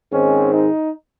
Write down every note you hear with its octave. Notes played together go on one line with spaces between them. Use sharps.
G#2 D#3 G#3 C4 C#4
D#4